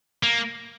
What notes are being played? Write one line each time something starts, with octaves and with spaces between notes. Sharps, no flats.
A#3